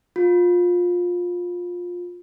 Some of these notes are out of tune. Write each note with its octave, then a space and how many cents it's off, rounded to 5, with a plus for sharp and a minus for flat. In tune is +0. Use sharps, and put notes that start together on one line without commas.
F4 +20